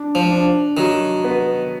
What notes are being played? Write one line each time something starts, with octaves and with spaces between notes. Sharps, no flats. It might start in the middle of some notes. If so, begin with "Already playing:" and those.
Already playing: D4
F3
D4
D#3 F#3
B3